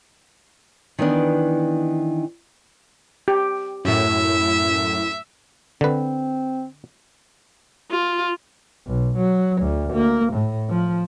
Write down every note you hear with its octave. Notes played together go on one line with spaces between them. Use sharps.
D#3 E3 B3 D4
G4
F#2 A2 E4 E5
D3 C4 B4
F4
B1
F#3
D2
A#3
A2
F3